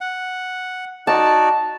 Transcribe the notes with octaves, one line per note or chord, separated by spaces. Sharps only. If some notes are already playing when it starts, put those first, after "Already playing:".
F#5
D#4 F#4 D5 A5